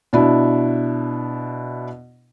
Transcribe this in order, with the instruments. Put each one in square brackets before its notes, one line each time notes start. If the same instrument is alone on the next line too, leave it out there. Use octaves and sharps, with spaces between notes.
[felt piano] B2 D4 E4